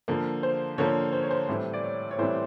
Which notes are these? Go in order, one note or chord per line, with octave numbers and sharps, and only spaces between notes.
D3 F3 A#3
C5
D3 F3 A#3 C#5
C5
C#5
C5
A2 E3 G3 C4
D5
C#5
C#5
A2 E3 G3 C4 C5